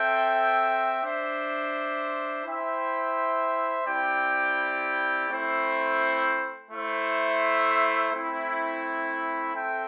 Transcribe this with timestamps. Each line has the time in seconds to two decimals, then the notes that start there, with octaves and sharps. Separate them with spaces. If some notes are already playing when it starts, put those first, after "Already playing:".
Already playing: C4 A4 E5 G5
1.03 D4 C5 E5
2.45 E4 C5 E5 G5
3.86 C4 E4 G4 D5 G5
5.29 A3 C4 E4 C5
6.71 A3 E4 C5 E5
8.13 A3 C4 E4
9.54 C4 A4 E5 G5